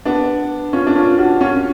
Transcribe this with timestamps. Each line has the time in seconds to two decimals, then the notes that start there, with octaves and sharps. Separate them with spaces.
0.05 B3 D4
0.73 C#4 F4
0.87 D4
0.96 C#4 F4
1.18 D4 F#4
1.41 C#4 F4